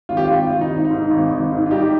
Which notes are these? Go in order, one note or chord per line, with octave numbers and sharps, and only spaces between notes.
G#1 F4
G4
F4
G#1
G#1 F4
D#4
G#1
D#4
G#2
G#1
G#1
G#2
F4
G3 D#4 G4